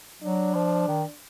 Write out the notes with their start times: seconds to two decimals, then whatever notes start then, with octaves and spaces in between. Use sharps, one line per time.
0.22 F#3 D4
0.55 F3
0.88 D#3